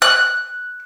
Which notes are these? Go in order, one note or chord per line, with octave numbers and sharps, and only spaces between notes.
F#6